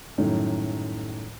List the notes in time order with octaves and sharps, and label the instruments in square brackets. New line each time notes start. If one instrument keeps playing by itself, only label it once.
[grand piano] F#2 A2 D#3 G3